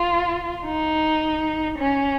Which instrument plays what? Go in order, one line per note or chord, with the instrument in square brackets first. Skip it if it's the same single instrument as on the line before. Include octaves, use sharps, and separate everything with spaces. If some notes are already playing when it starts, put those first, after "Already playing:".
Already playing: [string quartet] F4
D#4
C#4